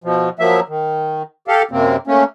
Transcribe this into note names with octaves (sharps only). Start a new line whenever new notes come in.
B2 F3
F3 F#3 A#3 E5
D#3
G4 A4 F5
F#2 C3 A#3 C4
A3 A#3 C#4